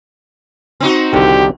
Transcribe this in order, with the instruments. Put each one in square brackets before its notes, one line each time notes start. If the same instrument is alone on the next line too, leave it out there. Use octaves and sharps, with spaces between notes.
[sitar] C4 D#4 F#4
[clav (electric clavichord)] C2 D3 D#3 [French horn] G4